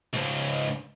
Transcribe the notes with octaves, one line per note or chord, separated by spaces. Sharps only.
C#2 G#2